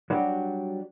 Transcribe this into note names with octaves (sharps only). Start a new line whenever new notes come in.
F#3 G3 D4 F#4 G4